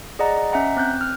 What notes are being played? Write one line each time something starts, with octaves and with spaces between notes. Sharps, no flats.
G#4 D5 D#5 F#5 A#5
D#5
C#4 E5 F#5 A#5
C4 F#6 G6
F6